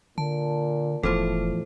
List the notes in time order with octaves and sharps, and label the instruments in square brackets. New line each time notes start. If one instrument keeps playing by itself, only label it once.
[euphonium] A#2 [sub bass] D3 [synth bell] A5
[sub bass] F1 [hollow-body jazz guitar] E2 A2 F3 [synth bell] A4 C5